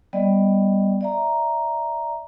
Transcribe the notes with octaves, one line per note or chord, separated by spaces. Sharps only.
G3 B3 D5 D#5
D5 E5 A#5